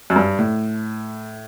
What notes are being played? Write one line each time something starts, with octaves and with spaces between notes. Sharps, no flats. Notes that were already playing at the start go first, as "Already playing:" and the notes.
F#2
G2
A2